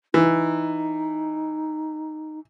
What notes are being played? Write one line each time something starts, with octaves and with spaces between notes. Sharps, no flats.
E3 D#4